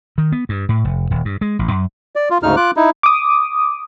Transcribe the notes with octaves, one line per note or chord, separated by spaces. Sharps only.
D#3
B3
G2
A2
F1
D#1
G2
G#3
A1
F#2
D5
F4
D2 G#2 C#3 D#4 F6
F4 D6 F#6
D#4 E4
D6 D#6